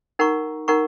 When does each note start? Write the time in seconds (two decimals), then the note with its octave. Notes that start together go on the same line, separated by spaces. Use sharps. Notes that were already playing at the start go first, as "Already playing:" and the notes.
0.19 D#4 A#4 F#5 A#5 C#6
0.68 D#4 A#4 F#5 A#5 C#6